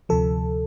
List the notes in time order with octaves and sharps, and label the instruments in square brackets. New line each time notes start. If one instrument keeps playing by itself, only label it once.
[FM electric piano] D2 C3 F3 A4